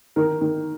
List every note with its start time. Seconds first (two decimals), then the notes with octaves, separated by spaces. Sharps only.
0.16 D#3 A#4
0.41 D#3